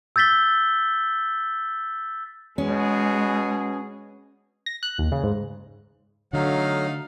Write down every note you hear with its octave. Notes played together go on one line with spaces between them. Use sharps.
E6 G6 A6 B6 G7
B2 G#3 C#4 G#4
A#6
F#6
D#2
C#3
G#2
D3 F#3 A3 D#4 F5